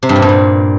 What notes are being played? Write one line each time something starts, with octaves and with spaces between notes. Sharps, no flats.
C3
G2
A#2
G2
A#2